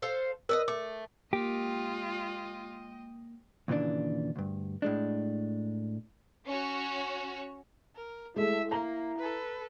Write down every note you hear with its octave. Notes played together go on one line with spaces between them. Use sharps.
A4 C5 F5
A#4 B4 D5 D#5
A3 D6
G#3 A#3 F4 G4 D#5 G5
D#2 A#2 C#3 E3 D4
D2 G2
A2 G#3 D4
C#4 F#4 C#5
A#4
G#3 A3 E4 E5
A#3 A#5
A4 B4